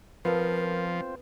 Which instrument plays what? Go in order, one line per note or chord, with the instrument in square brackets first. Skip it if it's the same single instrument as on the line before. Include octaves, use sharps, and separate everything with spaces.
[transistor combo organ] F3 [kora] B3 A4 F5 [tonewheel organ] C4 F4 C5 [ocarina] A#4